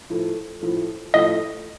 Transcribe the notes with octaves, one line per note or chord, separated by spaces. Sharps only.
A2 F3 A3
A2 F3 A3
A2 F3 A3 D#5